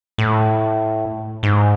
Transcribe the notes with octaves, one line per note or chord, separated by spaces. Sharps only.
A2
G#2